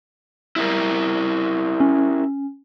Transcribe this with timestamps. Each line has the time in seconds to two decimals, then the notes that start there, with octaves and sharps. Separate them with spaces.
0.56 E4 G4 A#4
1.80 C#4